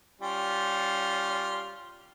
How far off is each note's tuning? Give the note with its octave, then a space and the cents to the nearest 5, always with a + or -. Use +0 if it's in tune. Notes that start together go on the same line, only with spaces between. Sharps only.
G3 -15 C#4 +5 F4 +0